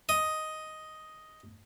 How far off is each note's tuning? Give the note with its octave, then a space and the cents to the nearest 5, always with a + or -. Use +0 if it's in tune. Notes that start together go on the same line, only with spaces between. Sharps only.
D#5 +5